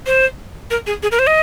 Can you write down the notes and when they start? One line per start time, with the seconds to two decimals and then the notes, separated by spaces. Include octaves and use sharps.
0.06 C5
0.71 A#4
0.87 G#4
1.03 G#4
1.11 A#4
1.19 C5
1.27 D#5